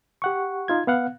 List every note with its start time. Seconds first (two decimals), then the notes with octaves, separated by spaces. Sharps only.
0.22 G4 F#5 C#6
0.68 D#4 F4 G#6
0.87 B3 F5 F#5